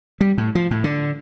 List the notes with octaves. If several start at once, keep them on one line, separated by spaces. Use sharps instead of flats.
G3
A2
F3
A2
D3